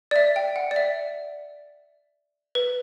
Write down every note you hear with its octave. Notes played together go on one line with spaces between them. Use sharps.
D5
E5
G5
F#5
D5
E5
B4